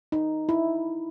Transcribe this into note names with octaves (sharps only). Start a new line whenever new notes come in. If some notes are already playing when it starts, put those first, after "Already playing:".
D#4
E4